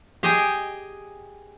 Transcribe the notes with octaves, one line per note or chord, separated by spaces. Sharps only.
G4 G#4 D#5 G5 G#5